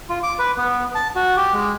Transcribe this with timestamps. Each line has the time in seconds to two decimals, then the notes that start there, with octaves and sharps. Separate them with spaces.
0.09 F4
0.23 D6
0.39 B4
0.58 B3
0.95 A5
1.15 F#4
1.37 G4
1.53 G#3